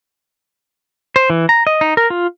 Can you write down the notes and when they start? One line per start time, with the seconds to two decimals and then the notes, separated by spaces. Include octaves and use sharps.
1.16 C5
1.30 E3
1.49 A#5
1.67 D#5
1.81 D#4
1.97 A#4
2.10 F4